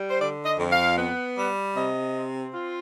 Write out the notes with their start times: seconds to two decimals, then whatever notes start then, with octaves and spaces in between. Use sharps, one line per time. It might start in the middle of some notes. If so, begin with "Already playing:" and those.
Already playing: G3
0.08 C5
0.19 D3 D5
0.45 D#5
0.58 F2
0.71 F5
0.97 B3
1.36 G3
1.75 C3 D#5
2.15 C4
2.53 F4